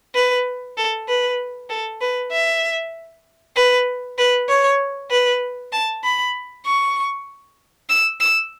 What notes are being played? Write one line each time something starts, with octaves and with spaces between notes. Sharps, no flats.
B4
A4
B4
A4
B4
E5
B4
B4
C#5
B4
A5
B5
C#6
E6
E6